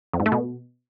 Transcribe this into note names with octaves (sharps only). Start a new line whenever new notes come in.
F2
G#2
A3
B2